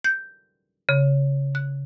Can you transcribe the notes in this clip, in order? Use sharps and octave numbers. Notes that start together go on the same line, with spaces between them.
G6
C#3
F#6